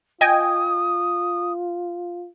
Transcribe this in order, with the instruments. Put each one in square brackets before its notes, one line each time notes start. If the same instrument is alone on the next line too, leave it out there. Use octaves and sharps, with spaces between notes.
[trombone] F4 [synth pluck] D#5 G5 G#5 [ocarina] D#6